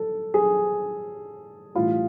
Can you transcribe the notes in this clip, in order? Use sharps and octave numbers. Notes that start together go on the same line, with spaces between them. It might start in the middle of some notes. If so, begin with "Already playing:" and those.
Already playing: A4
G#4
A2 E3 G3 F4